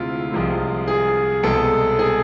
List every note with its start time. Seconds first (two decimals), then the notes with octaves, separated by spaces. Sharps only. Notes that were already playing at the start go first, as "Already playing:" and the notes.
Already playing: D2 C3 G#3 E4 F4
0.32 C2 C3 F3 G#3
0.88 G#4
1.43 C2 B2 G#3 A4
1.99 G#4